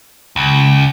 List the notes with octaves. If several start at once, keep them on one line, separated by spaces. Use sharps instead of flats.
C#2